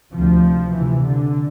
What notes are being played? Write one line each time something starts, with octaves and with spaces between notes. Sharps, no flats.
D2 C3 F3
D2 C3 E3
D3